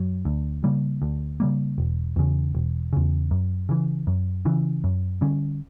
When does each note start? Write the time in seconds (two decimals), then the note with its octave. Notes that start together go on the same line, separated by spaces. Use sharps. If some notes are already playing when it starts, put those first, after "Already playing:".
Already playing: F#2 F#3
0.25 D2
0.64 C#3 G3 A#3
1.02 D2
1.40 C#3 G3 A#3
1.78 E1
2.16 E2 C#3
2.55 E1
2.93 E2 C#3
3.31 F#2
3.69 C#3 E3
4.07 F#2
4.45 C#3 E3
4.84 F#2
5.21 D3 G3 C#4